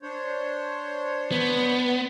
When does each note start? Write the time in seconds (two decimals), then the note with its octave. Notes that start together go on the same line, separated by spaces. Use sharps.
0.02 D4 C5 C#5
1.32 B3